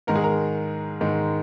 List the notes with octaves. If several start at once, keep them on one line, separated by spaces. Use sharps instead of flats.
G#2 D#3 G#3 A#4
G#4
A#4
G#2 D#3 G#3